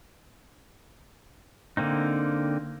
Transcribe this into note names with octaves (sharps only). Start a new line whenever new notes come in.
D3 A#3 C4 D#4